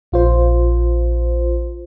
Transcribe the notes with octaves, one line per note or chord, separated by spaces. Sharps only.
A#1 F4 C5